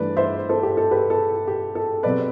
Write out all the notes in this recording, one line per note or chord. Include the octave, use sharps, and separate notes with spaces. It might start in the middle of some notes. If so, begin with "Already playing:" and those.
Already playing: G2 E3 A3 B4 D5
C5 E5
A4 C5
G4
A4
G4 B4
A4
G4
A4
B2 F#3 C4 B4 D5